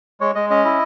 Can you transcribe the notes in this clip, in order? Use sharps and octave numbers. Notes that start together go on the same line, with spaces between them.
G#3 C#5
G#3 D#5
C#4 D#5
E4